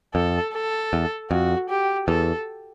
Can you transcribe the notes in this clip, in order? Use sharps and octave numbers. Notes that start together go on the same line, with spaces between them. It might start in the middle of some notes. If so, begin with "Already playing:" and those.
F2 A4
A4
E2
F2 F#4
G4
E2 A4